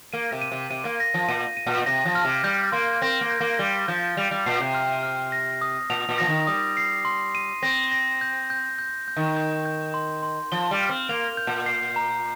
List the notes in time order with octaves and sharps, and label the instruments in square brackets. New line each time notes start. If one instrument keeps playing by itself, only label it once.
[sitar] A#3 [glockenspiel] D#7
[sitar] C3
[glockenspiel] D#7
[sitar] C3
[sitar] C3 [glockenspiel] D#7
[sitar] A#3
[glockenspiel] A#6
[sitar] F3
[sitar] A#2 [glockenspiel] D#7
[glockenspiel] D#7
[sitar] A#2
[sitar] C3 [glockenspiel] A#6
[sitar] F3
[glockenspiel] F6
[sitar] C3
[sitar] G3 [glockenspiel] G6
[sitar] A#3 [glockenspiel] C6
[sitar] C4 [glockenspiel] A#6
[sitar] A#3
[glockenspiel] G6
[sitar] A#3
[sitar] G3 [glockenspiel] G7
[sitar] F3 [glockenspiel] G6
[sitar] G3 [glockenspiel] F7
[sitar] G3
[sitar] A#2 [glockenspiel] C7
[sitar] C3
[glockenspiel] F6
F6
A#6
D#6
[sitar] A#2 [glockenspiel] F7
[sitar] A#2
[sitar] F3 [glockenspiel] A#6
[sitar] D#3
[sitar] G3 [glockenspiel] D#6
[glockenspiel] C7
C6
D#7
[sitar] C4 [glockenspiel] A#6
[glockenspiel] A#6
G6
G6
G6
G6
[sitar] D#3
[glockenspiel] G6
G6
C6
C6
[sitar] F3 [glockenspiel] G7
[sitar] G3
[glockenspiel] F6
[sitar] C4
[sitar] A#3 [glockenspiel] F7
[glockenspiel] G6
[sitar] A#2
[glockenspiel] C7
A#5